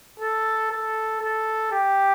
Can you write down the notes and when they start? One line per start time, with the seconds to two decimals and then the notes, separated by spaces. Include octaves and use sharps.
0.20 A4
0.71 A4
1.22 A4
1.72 G4